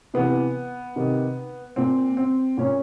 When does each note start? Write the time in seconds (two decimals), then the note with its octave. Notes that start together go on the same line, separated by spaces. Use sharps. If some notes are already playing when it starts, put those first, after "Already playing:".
0.14 C3 E3 B3
0.96 C3 D#3
1.76 A#2 C4
2.17 C4
2.58 A#2 C#4